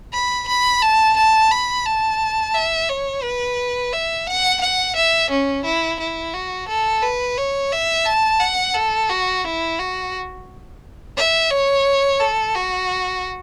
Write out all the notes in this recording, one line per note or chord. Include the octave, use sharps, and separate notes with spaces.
B5
B5
A5
A5
B5
A5
E5
C#5
B4
E5
F#5
F#5
E5
C#4
E4
E4
F#4
A4
B4
C#5
E5
A5
F#5
A4
F#4
E4
F#4
E5
C#5
A4
F#4